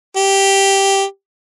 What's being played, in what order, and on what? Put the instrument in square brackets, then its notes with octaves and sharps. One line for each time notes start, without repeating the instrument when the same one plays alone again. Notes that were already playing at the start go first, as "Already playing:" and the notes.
[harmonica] G4